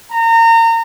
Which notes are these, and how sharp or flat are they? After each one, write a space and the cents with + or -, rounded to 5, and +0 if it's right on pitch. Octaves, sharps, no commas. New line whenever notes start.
A#5 -30